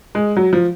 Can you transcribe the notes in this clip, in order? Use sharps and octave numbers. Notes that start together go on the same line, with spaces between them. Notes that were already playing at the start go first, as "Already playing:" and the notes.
G#3
F#3
F3